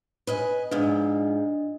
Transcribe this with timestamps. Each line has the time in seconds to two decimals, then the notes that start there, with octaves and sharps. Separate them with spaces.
0.27 B4 D#5 G#5
0.71 G#2 F3 D4 D#5